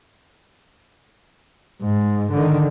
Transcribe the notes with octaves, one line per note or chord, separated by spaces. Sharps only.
G#2
D3 D#3